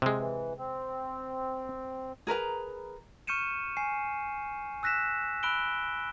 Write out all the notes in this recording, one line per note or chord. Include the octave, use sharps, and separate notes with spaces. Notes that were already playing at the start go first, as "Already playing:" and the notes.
C3 G#3
E3
C4
G#4 A#4 B4 A#5
C#6 F6 G6 C#7 D#7 E7
G#5 C7
E6 F#6 A#6 B6 E7
B5 E6 F#6 D7 G7